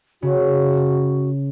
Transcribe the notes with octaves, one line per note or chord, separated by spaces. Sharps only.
C#3 F#4